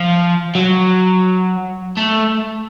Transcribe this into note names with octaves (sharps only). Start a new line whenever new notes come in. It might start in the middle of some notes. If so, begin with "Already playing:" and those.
Already playing: F3
F#3
A3